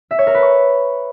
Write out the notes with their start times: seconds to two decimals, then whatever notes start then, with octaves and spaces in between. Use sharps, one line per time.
0.11 E5
0.19 C#5
0.27 A#4
0.35 B4
0.42 C#6